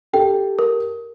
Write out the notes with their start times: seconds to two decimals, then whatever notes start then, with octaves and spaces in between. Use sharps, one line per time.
0.13 G4 A4 G5
0.59 A#4